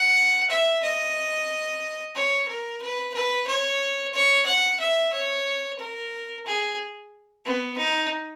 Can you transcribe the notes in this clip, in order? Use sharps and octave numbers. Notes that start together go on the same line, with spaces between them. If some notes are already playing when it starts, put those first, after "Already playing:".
Already playing: F#5
E5
D#5
C#5
A#4
B4
B4
C#5
C#5
F#5
E5
C#5
A#4
G#4
B3
D#4